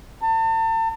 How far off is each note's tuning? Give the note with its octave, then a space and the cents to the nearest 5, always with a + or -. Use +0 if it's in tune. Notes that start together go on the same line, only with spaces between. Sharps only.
A5 +40